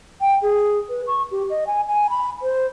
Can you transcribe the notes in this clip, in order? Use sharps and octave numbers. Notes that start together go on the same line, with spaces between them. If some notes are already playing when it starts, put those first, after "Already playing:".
G5
G#4
B4
C#6
G4
D#5
G#5
G#5
B5
C5